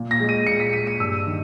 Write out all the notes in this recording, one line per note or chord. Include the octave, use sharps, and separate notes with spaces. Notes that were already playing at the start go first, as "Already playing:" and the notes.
Already playing: A#2
A#6
G#3
D#7
A#2 C#7
B6
G#3 D#7
D#7
G2 E6
D#3